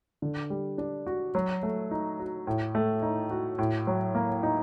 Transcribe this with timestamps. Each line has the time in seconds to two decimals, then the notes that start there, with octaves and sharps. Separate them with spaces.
0.22 D3
0.50 G3
0.78 D4
1.07 F#4
1.35 F#3
1.63 A3
1.91 D#4
2.19 F#4
2.47 A2
2.75 A3
3.02 D#4
3.31 F#4
3.58 A2
3.87 F#3
4.15 A#3
4.43 D#4